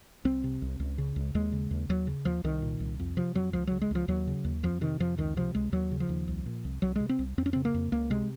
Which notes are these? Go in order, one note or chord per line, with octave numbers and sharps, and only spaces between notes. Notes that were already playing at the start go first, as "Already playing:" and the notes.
C2 C4
C3
C2
C#2
C#3
C#2
D#2 G#3
C#3
D#2
D#2 F#3
C#3
D#2 F3
C2 D#3
A#2
C2
F2
C3 F3
F2 F#3
C#2 F3
C#3 F#3
G#3
C#2 F3
D#2 F#3
C#3
D#2
F2 F3
C3 D#3
F2 F3
C#2 D#3
C3 F3
C#2 G#3
D#2 F#3
C#3
F3
D#2
C2
A#2
C2
C2 F#3
C3 G#3
C4
C2
F2 C4
C#4
C#3 C4
A#3
F2
C#2 A#3
C3 G#3